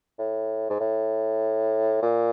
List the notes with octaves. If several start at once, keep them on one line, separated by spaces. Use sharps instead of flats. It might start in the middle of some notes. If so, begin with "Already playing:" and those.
A2
G#2
A2
A#2